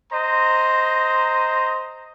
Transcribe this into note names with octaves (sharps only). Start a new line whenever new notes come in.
C5 D#5 A#5